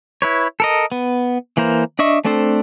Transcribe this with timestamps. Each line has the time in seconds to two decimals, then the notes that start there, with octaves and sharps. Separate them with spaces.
0.22 E4 B4 C#5
0.60 A4 A#4 D#5
0.92 B3
1.57 E3 A#3 A#4 C5
1.99 D4 D#5 E5 C#6
2.25 A3 C4 D4 A4 C5